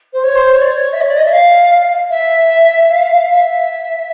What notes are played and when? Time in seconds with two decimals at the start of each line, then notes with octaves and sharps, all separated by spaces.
0.13 C5
0.23 C#5
0.35 C5
0.53 C#5
0.61 D5
0.71 C#5
0.93 E5
1.01 C#5
1.08 D5
1.17 D#5
1.25 E5
1.32 F5
2.10 E5
2.90 F5
3.30 E5